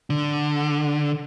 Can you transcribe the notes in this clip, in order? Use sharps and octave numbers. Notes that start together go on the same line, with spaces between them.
D3